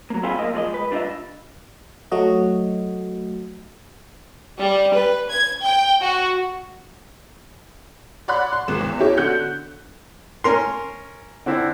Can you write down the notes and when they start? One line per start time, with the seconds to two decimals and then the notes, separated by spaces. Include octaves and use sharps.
0.10 F#3 A#3
0.23 C4 E4 F4 G4 G#4
0.39 B1 A#3 D#5
0.54 F3 G#3 D5 D#5
0.74 B4
0.91 G3 D4 F4 C5 D#5 E5
2.12 F#3 A3 F#4 D#5
4.59 G3
4.94 B4
5.31 G#6
5.64 G5
6.02 F#4
8.28 C#5 D5 F#5 B5 C6 F#6
8.53 C6
8.68 G#1 C#2 E7
8.81 E2
8.99 C#4 E4 G4 C#5
9.17 D3 F#4 F#6 G6 C#7
10.44 C#4 A#4 C6
11.46 D3 C4 E4